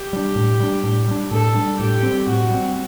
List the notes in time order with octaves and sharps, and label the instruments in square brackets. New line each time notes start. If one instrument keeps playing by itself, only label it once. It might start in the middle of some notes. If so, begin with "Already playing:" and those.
Already playing: [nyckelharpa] G4
[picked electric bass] G3 D4
A2
G3 D4
A2
G3 D4
[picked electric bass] A2 [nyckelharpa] A4
[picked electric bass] G3 D4
[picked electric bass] A2 [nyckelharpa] G4
[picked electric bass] G3 C4
[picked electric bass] A2 [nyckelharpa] F#4
[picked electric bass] G3 C4